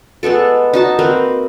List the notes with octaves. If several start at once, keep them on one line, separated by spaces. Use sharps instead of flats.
G#3 A3 B3 A4
D#4 F#4 A5
A#3 C4 A#4 B4